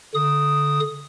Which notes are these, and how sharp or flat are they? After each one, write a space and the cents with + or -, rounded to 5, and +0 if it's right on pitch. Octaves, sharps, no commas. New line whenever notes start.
D3 -20 D#6 +0